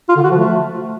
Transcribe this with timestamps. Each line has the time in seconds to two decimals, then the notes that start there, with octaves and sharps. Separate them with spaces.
0.09 F4
0.16 D3
0.23 F#4
0.31 F3
0.38 A3